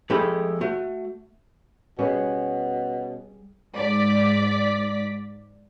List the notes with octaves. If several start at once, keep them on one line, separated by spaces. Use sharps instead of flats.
F2 G#3 A3 G4 G#4 B5
A3 F#4
B2 G3 B3 C#4 G#4
G#2 D5 B6